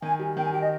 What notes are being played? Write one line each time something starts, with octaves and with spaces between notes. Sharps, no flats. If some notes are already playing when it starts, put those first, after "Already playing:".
D#3 G#5
G3
D#3 G5
G#5
G4 G5
D#5